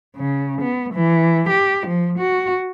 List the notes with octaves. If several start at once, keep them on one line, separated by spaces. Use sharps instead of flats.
C#3
B3
E3
G4
F3
F#4